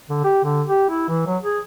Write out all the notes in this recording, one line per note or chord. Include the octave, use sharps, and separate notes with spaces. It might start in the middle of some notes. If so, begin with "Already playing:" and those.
D3
G4
D3
G4
E4
E3
F#3
G#4